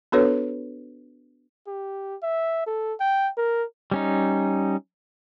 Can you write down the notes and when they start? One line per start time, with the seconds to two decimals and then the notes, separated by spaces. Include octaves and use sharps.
0.12 B3 D4 F#4 A4 B4 C#5
1.67 G4
2.22 E5
2.66 A4
3.00 G5
3.37 A#4
3.91 G3 C#4 D#4